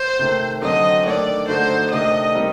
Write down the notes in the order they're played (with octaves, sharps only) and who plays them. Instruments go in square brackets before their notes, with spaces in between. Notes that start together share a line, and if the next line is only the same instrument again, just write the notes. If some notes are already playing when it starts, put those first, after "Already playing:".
Already playing: [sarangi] C5
[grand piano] C3 D#3 A3
[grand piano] D3 F#3 C4 [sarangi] D#5
[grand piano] D#3 A3 D4 [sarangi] D5
[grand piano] D3 A3 D#4 F#4 [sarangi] C5
[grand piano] C3 D#3 A3 D4 [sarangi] D#5
[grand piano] D#3 G3 C4 D#4